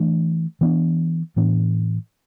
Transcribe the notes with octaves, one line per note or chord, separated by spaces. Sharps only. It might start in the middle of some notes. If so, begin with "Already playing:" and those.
Already playing: E3 A3 D4
E3 B3 D4
A2 E3 B3 D4